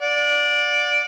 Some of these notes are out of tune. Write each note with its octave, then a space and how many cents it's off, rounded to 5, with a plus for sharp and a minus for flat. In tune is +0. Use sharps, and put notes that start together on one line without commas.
D5 +0 F#5 -40